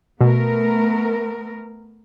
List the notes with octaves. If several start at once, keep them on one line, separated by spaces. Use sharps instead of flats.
B2 A3 B3 A#4